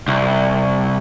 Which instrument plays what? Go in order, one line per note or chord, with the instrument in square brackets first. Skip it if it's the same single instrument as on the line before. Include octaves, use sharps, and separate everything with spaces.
[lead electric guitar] C2